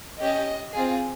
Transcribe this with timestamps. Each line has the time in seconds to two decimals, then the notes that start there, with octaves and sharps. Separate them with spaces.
0.20 C#4 G4 D#5
0.73 C4 F4 G#4